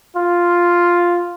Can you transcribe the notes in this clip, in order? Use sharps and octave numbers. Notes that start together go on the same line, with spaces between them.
F4